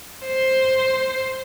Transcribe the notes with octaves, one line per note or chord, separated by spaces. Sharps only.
C5